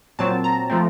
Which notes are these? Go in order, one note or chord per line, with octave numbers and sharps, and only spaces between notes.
A#2 F#3 C4 A5
A#5
F3 A3 C4